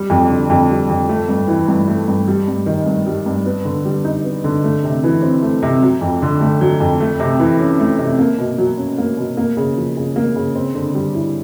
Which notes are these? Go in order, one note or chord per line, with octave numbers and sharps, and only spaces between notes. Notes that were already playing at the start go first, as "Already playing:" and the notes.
Already playing: G3
F2
D3
F2
G3
F2
A3
G2
E3
G2
A3
G2
G3
G2
D#3
G2
G3
G2
B3
D3
G3
D#4
B3
D3
A3
C3
E3
C4
A3
C3
F#3
F2
D3
A3
F#3
F2
A3
C3
E3
C#4
A3
C3
A#3
B2
F#3
C#4
A#3
B2
A#3
C#3
F3
C#3
A#3
C#3
C4
D3
G3
E4